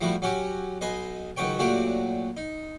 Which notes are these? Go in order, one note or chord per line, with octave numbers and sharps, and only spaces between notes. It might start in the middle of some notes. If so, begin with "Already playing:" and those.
F3 G3 A3 E4 F#4
F#3 C#4 F#4 G4
B1 B4 D#5 G#5 C6
C#2 D#3 F#3 B4 C#5 G5
A#2 F#3 A3 D4 F#4 G4
D#4